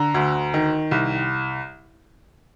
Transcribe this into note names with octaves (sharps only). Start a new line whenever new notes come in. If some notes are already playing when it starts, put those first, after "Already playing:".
Already playing: D3 A#5
D2
D#3
C2